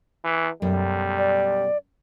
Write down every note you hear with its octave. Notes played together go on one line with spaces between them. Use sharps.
E3
F#2 B2 G3 A3
D5